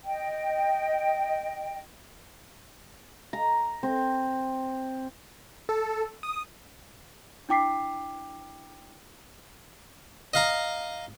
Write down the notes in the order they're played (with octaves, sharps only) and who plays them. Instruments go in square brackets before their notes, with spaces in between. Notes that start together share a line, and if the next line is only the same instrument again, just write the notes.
[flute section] D#5 G5
[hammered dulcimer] A#5
C4
[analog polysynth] A4
D#6
[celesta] D4 E4 G5 D6 B6 C7
[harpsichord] D#5 F5 A#5